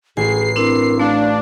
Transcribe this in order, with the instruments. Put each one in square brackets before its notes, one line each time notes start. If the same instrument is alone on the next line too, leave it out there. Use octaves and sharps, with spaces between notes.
[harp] A1 [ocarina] G#4 [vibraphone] G#5 [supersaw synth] C7
[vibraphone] C4 D4 E4 [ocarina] A#4
[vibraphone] A3 [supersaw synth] D4 [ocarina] F5